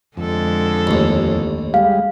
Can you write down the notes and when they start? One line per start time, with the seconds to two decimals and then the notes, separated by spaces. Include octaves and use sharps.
0.17 F2 D3 G#3 A4
0.87 A1 D#2
1.74 G3 G#3 F5